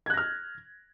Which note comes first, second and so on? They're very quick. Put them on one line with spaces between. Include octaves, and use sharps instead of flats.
G#6 F#6 A#6 F6